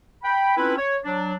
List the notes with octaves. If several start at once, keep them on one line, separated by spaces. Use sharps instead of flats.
G5 B5
C4 C#4 E4 F4 A4 B4
C#5
F#3 D4